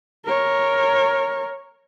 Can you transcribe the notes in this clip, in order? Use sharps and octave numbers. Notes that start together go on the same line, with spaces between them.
A#4 C#5